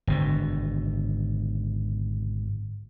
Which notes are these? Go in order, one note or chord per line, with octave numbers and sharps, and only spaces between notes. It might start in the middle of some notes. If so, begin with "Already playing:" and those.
G#1 B2 D3